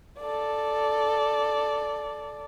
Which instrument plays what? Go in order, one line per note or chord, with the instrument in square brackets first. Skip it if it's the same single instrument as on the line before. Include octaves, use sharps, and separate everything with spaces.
[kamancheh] A4 D5